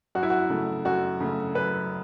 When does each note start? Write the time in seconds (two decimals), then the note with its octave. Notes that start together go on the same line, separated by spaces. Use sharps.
0.15 F#2 F#4
0.23 E4
0.30 F#4
0.50 C#3 A3
0.85 F#2 F#4
1.20 C#3 A3
1.55 F#2 B4